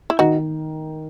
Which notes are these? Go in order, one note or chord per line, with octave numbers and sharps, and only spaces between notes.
E4
D#3 D#4 F#4